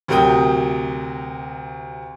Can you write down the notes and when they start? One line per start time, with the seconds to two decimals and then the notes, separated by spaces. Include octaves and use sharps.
0.08 D2 C3 F#3 A#4 G5 D#6